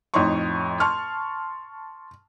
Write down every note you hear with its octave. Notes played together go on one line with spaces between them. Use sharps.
F2 A2 D#4 C#5 C6 C#6
A5 C6 C#6 F6